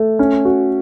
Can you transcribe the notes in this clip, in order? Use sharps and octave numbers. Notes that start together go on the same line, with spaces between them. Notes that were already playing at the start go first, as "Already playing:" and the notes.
Already playing: A3
C#4
F#4